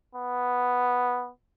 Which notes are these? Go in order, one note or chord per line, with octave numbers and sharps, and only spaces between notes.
B3